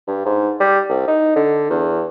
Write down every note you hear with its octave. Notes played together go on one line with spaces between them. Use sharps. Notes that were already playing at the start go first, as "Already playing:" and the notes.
G2
G#2
G3
C2
D#4
D3
E2